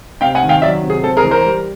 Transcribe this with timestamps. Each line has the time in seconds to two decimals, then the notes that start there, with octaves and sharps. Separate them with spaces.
0.21 C3 F5 G5
0.35 F#5 G#5
0.42 D#3
0.49 F5 G5
0.62 F#3 D5 E5
0.83 C3
0.90 G#4
1.04 C4 A4
1.17 G#4 A#4
1.24 E3
1.31 A#4 C5
1.45 G3